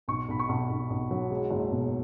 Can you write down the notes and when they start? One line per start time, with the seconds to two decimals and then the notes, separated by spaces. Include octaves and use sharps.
0.08 B1 C#6
0.28 B1 B5
0.39 C#6
0.49 B1
0.70 B1
0.90 B1
1.11 F#3
1.31 G#3
1.51 F#1
1.72 B2